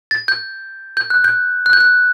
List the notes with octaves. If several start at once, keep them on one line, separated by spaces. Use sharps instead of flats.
A6
G6
G6
F#6
G6
F#6
G6
F#6